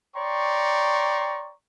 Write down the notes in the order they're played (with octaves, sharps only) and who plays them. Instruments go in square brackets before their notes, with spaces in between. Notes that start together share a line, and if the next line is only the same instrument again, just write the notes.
[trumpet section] C#5 D5 G5 A#5 C6 C#6